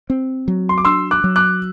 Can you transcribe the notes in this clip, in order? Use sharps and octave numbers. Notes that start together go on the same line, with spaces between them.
C4
F#3
C6
D6
D4 C6 E6
D6 F#6
F#3
D6 F#6